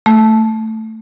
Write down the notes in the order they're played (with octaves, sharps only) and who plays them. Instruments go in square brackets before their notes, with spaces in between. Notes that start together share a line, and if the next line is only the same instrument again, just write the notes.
[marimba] A3